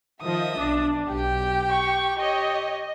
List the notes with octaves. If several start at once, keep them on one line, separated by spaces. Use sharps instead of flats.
D#3 F3 D#5 E5 D#6
B1 D4
B1 G4 G5
C#6
G4 C#5 D#5